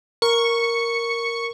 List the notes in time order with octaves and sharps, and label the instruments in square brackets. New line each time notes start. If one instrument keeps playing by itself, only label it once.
[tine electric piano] A#4 [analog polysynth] C#6